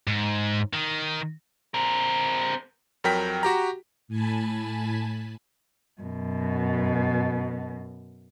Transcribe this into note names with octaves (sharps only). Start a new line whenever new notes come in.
G#2
D#3
C4 A#4
F2 F#3 A#4 G5 B6
F#4 G4 A#5
A2 G#5 A5 B5
F#2 B2